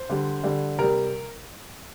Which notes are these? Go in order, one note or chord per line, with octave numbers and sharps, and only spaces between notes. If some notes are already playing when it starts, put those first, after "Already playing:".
Already playing: C5
D3 G3
D3 G3
C3 G3 A#4